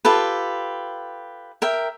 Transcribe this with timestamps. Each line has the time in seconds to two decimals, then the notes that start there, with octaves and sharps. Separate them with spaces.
0.05 F4 G4 A4 B4
1.62 A#4 E5 G5